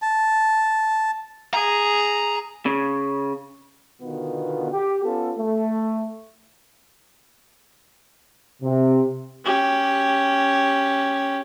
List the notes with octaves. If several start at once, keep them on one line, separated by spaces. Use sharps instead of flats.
A5
G#4 A#5
C#3
B2 D3 D#3 B3 F4
G4
B3 C#4 F4 A4
A3
C3
C#4 G4